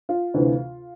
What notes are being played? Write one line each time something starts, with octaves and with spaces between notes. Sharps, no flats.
F4
D2 C3 E3